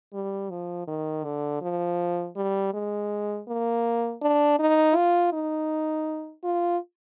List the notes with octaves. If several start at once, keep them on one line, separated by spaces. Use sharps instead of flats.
G3
F3
D#3
D3
F3
G3
G#3
A#3
D4
D#4
F4
D#4
F4